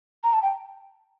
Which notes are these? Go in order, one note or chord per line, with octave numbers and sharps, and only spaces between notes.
A#5
A5
G5